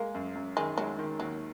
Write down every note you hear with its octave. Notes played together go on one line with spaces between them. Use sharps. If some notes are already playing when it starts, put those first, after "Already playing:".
Already playing: G#3 A#3
F#2
F#2
D#3 G#3
F#3 G#3
D#3
D#2 F#3